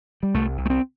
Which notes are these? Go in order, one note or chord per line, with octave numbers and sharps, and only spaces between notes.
G3
C2 A3
C2
A3
C4